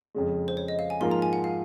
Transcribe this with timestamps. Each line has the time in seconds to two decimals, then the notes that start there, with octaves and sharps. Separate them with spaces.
0.15 F2 C#3 G#3
0.48 C5
0.57 C#5
0.68 D#5
0.79 F5
0.90 G#5
1.00 G#2 F3 A#3 F4 A#4 C6
1.11 A#5
1.22 G#5
1.33 F#5
1.44 F5